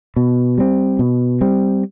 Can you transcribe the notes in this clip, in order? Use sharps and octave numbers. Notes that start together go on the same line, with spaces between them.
B2
G3 C4
B2
G3 C4